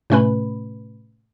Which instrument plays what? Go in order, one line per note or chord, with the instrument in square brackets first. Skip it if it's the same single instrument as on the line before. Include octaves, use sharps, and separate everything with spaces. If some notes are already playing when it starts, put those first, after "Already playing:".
[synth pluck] A2 C3 A3 C#4 B4 B5